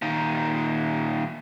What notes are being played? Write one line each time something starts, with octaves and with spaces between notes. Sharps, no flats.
A#2 D#3